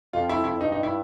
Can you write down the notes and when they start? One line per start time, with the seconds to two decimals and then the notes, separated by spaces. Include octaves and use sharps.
0.13 F2 F4
0.29 E4
0.44 E4
0.60 G2 D#4
0.72 D#4
0.83 E4